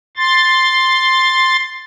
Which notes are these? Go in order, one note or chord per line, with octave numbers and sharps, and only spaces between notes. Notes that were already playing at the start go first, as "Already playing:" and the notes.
C6 A6